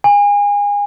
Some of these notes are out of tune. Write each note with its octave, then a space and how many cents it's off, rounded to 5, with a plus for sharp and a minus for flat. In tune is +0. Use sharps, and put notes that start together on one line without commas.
G#5 -30